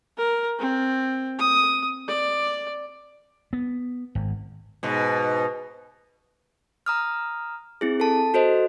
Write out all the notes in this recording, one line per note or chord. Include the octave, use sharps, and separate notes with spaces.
A#4
C4
D#6
D5
B3
G#1
G#2 B2
A#5 D#6 F6
C4 E4 G#4
A4 A5
F#4 A4 C5 D#5